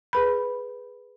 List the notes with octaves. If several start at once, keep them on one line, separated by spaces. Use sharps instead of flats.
G#4 B4 B5